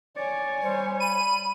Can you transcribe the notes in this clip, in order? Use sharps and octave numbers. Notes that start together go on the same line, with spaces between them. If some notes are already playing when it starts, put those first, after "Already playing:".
C#5 D5 G#5
G3 C5
B5 D#7